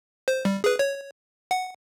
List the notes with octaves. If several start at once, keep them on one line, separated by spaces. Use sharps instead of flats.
C5
G3
G#4 B4
C#5
F#5